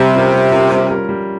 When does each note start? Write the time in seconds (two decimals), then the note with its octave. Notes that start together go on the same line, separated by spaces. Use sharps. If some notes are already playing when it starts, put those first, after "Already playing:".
Already playing: C3 G3
0.13 C#4 F4 A#4
0.32 G3
0.51 C#4 F4 A#4
0.71 G3
0.90 C#4 F4 A#4
1.09 G3